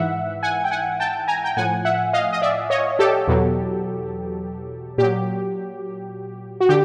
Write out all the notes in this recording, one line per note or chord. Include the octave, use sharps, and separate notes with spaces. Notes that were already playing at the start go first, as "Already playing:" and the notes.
Already playing: G#2 E3 E5 F#5
F#5 G#5
G5
F#5 G#5
G5 A5
G#5 A#5
G5
A2 F3 F#5 G#5
E5 F#5
D#5 F5
D#5
D5 E5
C#5 D#5
G4 A4
E2 B2 F#3
A#2 F#3 G4
F#4
D3 G4